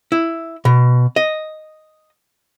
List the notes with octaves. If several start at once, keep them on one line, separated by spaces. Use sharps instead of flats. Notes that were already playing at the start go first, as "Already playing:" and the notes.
E4
B2
D#5